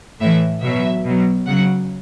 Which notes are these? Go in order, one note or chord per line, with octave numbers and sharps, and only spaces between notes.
A2 E3 E5
B2 F#3 E5
B2 F#3
C#3 F#3 F#5